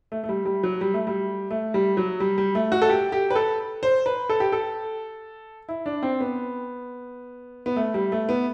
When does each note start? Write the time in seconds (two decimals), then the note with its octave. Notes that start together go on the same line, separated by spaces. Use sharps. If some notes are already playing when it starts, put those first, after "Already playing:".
0.12 A3
0.24 A3
0.29 G3
0.45 G3
0.63 F#3
0.81 G3
0.94 A3
1.07 G3
1.51 A3
1.74 G3
1.97 F#3
2.20 G3
2.38 G3
2.55 A3
2.72 F#4
2.82 A4
2.89 G4
3.12 G4
3.31 B4
3.36 A4
3.83 C5
4.06 B4
4.30 A4
4.40 G4
4.52 A4
5.69 E4
5.86 D4
6.03 C4
6.21 B3
7.66 B3
7.76 A3
7.94 G3
8.12 A3
8.29 B3